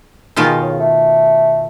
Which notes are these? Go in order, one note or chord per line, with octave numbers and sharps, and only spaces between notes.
B2 D#3 F4 G#4
C#3
A3